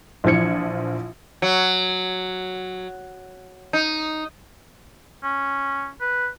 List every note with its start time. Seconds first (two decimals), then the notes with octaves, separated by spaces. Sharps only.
0.24 A#1 E3 F3 G#6 C#7
1.42 F#3
3.73 D#4
5.23 C#4
6.01 B4